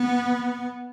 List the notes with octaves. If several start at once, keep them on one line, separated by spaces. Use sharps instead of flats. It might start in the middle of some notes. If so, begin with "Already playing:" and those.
Already playing: B3